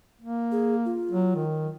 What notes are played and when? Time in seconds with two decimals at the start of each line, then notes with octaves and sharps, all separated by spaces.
0.21 A#3
0.52 G#4
0.85 F4
1.11 F#3
1.35 D#3